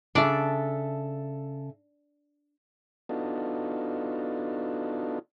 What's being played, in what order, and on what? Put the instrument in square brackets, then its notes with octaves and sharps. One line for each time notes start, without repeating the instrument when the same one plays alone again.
[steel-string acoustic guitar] C#3 A4 E5 [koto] D4 D5
[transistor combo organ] B3 D4 D#4 F4 F#4 A4